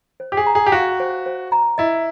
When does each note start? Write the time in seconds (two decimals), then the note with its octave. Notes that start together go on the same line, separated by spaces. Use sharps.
0.20 C5
0.32 G4
0.37 G#4
0.46 A#5
0.55 G#4
0.66 G4
0.72 F#4 F5
1.00 C5
1.26 C5
1.52 A#5
1.78 E4 D#5